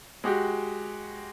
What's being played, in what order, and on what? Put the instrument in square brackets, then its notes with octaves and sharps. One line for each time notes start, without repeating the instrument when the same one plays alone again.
[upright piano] G#3 F#4 G4